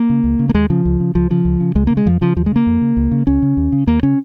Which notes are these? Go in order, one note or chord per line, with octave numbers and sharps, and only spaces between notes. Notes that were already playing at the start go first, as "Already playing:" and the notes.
Already playing: A#3
C#3
C#2
C#3
A#3
D#2 G#3
C#3 F3
C#2
C#3
C#2 F3
C#3 F3
C#2
C#3
C#2 G#3
C#3 A#3
G#3
F2 F3
C#3 F3
D#2 F3
G#3
C#3 A#3
F2
C#3
C#2
C#3
C#2 C#4
C#3
D#2
C#3
D#2 A#3
C#3 C#4